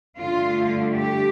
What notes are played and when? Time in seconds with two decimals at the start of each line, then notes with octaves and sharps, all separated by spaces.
0.18 G2 D3 A3 F4
0.94 G4